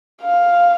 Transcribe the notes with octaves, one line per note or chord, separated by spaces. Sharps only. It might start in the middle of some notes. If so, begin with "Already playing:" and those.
F5